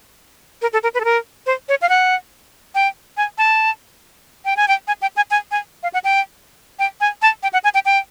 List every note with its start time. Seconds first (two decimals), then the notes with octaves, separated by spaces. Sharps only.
0.62 A#4
0.73 A4
0.83 A#4
0.94 B4
1.00 A4
1.05 A#4
1.46 C5
1.69 C#5
1.82 F5
1.89 F#5
2.75 G5
3.17 G#5
3.38 A5
4.45 G5
4.57 G#5
4.68 G5
4.88 G#5
5.02 G5
5.16 G#5
5.31 G#5
5.51 G#5
5.83 F5
5.94 F#5
6.04 G5
6.79 G5
7.01 G#5
7.22 A5
7.43 G5
7.53 F#5
7.64 G#5
7.74 G5
7.85 G5